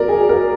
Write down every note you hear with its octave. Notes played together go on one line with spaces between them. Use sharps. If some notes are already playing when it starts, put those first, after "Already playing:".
Already playing: F#3 A#4 D5
G#4
A#4